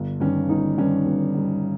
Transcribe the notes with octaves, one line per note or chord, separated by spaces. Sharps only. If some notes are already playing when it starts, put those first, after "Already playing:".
Already playing: G1
G2 D#3 C#4
G1 D#4
G2 D#3 C#4
G1
G2 D#3